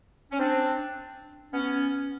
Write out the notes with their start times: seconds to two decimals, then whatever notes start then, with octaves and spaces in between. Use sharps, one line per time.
0.32 C#4
0.40 C4 D4
1.53 B3 C#4